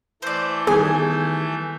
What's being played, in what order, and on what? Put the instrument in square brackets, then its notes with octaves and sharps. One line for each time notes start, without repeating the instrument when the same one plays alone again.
[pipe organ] E3 A3 G6 [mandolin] C5 D5
[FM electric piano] D#3 G3 B3 [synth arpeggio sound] G#4 [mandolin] G#5